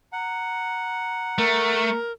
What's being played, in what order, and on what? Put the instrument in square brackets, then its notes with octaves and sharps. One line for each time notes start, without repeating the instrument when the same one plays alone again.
[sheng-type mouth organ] F#5 [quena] A#5
[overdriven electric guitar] A3 [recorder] A#4